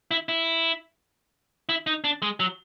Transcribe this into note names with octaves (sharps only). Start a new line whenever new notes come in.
E4
E4
E4
D#4
D4
G#3
F#3